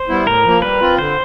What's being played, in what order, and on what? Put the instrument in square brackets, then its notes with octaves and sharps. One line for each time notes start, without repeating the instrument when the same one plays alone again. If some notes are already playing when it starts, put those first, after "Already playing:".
Already playing: [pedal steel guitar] C5
[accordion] G3 B3 E4
[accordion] A2 [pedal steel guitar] A#4
[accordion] F3 A#3
[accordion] G3 [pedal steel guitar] B4
[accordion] C4 F4
[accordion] D3 [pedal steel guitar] C5